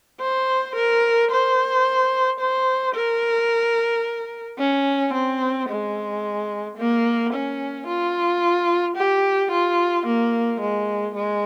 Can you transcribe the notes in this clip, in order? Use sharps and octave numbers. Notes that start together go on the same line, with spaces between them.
C5
A#4
C5
C5
A#4
C#4
C4
G#3
A#3
C#4
F4
G4
F4
A#3
G#3
G#3